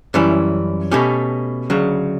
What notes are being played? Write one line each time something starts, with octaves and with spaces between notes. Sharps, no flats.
F#2 E3 G3 C#4 E4
B2 A3 C#4 G4
D2 C#3 F#3